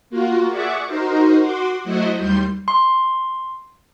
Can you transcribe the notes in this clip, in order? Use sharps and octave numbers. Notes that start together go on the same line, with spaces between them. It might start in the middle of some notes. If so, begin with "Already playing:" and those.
A#3 F4 F#4
G#4 D5 E5 F#5 C#6 D6
D#4 F#4 A#4 C5
F#4 F#5 C6 D6
F#3 A3 E4 F#4 C5 D#5
D#2 G3 C6 G6
C6